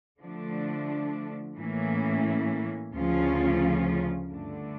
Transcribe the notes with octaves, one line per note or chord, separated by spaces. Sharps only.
D3 F3 A3 D4
A2 E3 A#3 C#4
D2 C#3 F3 C#4 F4
G2 D3 A3 D4